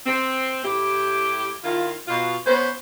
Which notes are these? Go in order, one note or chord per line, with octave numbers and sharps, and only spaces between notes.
C4
A2 E4 G4
D#3 E4 F4
B2 F4
B3 C#4 B4 C5